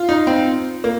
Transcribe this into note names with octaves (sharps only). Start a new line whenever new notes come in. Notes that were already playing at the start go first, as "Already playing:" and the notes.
Already playing: F4
D#4
C4
A#3